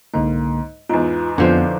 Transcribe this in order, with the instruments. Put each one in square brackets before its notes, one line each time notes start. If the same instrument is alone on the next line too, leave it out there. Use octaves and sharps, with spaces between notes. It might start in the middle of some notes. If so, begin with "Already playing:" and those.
[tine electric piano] C2 D3 A#3 [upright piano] G#2
[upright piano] E2 G#2 [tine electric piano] F4
[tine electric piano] F2 B3 [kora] D3 F3 C5